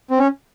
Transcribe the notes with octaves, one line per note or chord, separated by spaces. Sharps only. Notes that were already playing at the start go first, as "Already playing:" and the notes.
C4
C#4